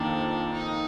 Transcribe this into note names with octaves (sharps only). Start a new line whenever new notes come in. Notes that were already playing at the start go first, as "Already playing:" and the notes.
Already playing: F2 D#3 A#3 D4
D#4